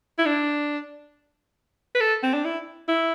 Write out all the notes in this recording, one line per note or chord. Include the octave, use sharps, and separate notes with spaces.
E4
D4
B4
A4
C4
D4
E4
E4